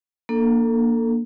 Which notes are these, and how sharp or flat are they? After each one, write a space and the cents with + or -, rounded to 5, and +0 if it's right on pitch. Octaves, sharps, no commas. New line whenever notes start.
A#3 +5 D4 +0 A4 +25